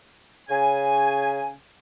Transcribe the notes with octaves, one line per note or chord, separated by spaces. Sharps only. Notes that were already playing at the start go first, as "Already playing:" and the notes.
C#3 G#5